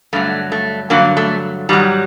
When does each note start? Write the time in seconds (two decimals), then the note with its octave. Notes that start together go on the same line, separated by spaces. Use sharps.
0.13 G2 D3 F#3 A3
0.52 A3
0.90 G2 D3 F#3 A#3
1.17 A3
1.69 G#2 D#3 F#3 G3